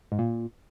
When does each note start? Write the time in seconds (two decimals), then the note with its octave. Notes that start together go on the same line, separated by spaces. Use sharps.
0.12 G#2
0.19 A#2